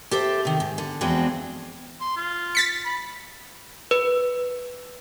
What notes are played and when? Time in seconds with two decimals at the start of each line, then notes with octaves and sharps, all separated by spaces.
0.11 G4 A4 C5 E5
0.45 C3 D#3
0.60 G#2
0.78 D3
1.01 E2 F3 G#3 C4 D4 F#4
2.01 C6
2.16 F4
2.55 A6 B6 C#7
2.85 B5
3.91 B4